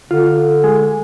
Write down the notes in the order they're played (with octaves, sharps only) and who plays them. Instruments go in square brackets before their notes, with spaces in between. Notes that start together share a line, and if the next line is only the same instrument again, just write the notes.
[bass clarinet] D3 [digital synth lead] F4
[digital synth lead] G#3